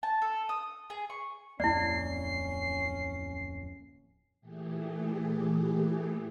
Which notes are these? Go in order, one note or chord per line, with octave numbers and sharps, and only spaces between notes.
A5
A4
D#6
G#4
C#6
D1 F2 A#3 C#4 E4 D5 C7
A#2 E3 A3 G4 G#4